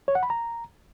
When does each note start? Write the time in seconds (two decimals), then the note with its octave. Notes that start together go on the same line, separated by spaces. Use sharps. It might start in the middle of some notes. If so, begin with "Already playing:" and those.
0.08 C#5
0.15 F#5
0.23 B5
0.30 A#5